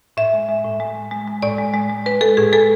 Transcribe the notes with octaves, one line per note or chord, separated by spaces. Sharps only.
A2 E5
G#3
G#3
A2
G#3
G#3
G#3
G#3
A2 D5
G#3
G#3
G#3
G#3 B4
G#3 A4
A2 G#4
G#3 A4